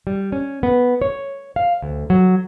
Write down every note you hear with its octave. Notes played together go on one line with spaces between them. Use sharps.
G3
C#4
B3
C#5
F5
D2
F#3